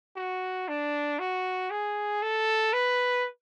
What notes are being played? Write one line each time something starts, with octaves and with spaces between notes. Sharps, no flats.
F#4
D4
F#4
G#4
A4
B4